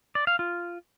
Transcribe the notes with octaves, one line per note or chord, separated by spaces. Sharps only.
D5
F5
F4